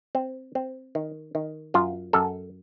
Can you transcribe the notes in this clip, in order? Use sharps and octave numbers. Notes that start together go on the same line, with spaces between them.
C4
C4
D#3
D#3
F#2 F4
F#2 A4